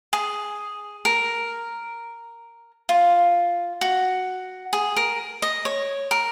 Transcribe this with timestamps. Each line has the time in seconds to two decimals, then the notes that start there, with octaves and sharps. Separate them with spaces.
0.13 G#4
1.05 A#4
2.89 F4
3.81 F#4
4.73 G#4
4.96 A#4
5.42 D#5
5.65 C#5
6.11 A#4